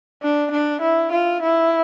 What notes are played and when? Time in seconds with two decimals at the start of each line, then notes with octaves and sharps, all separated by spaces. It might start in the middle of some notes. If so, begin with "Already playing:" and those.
0.23 D4
0.51 D4
0.81 E4
1.12 F4
1.42 E4